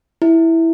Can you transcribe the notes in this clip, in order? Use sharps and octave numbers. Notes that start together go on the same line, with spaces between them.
E4